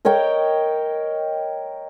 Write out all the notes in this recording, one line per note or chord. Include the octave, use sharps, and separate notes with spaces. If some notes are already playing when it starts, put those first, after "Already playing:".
A#4 C#5 D#5 G5